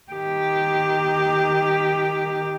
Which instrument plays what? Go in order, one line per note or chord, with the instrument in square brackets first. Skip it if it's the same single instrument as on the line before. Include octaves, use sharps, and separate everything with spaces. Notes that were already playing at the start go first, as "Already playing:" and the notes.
[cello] D#3 G4